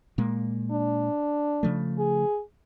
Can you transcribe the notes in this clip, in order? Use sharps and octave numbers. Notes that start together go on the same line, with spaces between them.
A#2 G#3 A#3
D4
C#3 F3 A3
G#4